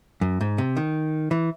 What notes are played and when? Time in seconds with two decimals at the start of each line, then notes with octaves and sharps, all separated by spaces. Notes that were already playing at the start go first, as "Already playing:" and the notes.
0.21 F#2
0.41 G#2
0.58 C3
0.77 D#3
1.31 E3